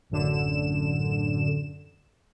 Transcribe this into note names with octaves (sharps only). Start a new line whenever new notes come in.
A1 F#2 D3 E7